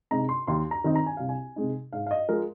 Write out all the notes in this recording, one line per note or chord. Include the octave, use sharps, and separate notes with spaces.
C3 G#3 D#4 A#5
C6
D#2 C6
A#5
D#3 C4 D#4
A#5
G#5
C2 F5
G#5
C3 G#3 D#4
G#2 F5
F5
D#5
F3 G#3 A#4